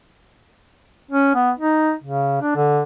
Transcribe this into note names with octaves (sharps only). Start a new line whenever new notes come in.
C#4
B3
D#4
C#3
D4
D3